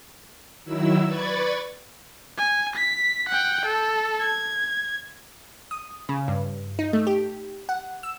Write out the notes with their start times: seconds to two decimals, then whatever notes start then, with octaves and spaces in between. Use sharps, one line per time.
0.65 D#3 F#3 E4 E6
1.06 B4 D5 B5 C#6 G#6 A6
2.38 G#5
2.76 B6
3.28 F#5 G5
3.65 A4
4.20 G#6
5.71 D#6
6.09 C#3
6.28 G2
6.79 D#4
6.93 A3
7.07 G4
7.69 F#5
8.03 E6